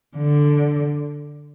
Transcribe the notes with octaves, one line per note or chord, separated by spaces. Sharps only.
D3